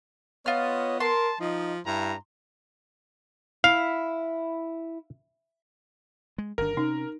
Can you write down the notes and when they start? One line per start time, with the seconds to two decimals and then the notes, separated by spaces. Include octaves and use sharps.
0.46 B3 F4 C#5 D#5 F6
1.00 A#4 A5 C6
1.41 F3 D#4 D#5
1.86 G2 E4 A#5
3.64 E4 F5
6.38 G#3
6.58 G1 D#3 D4 A#4
6.77 C3 C#4 D#4